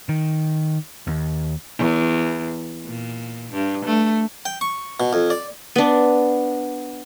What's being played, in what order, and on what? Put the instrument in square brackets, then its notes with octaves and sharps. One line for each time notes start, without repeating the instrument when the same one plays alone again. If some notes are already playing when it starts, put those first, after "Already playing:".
[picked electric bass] D#3
D#2
[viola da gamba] E2
A#2
G2
A3
[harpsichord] G5
C#6
B2
F2
D5
[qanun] B3 D4